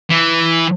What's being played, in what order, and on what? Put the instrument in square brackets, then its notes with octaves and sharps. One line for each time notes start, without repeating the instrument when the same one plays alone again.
[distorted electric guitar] E3